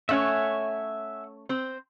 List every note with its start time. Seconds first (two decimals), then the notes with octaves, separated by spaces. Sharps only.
0.09 A3 C#4 C#5 E5 F#5 G#5
1.49 C4 C5